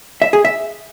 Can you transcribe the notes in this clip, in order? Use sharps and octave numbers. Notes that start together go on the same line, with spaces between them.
E5
G#4
E5